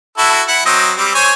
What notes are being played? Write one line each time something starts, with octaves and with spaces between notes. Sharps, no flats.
E4 F#4 A4
E4 F#5
F#3 C4 D#5
G3 C4
C5 C#5 G#5